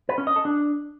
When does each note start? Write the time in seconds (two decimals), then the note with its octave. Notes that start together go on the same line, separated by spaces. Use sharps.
0.09 B4
0.18 C#4
0.27 D#5
0.36 A4
0.45 D4